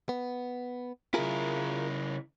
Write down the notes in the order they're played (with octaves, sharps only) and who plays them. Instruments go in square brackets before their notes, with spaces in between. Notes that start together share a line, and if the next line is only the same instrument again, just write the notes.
[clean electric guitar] B3
[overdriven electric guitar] C#3 E4 [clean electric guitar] F4 G#4 A#4